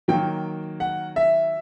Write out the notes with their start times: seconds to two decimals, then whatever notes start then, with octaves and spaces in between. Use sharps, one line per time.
0.08 D#3 F#3 A#3 G5
0.80 F#5
1.16 E5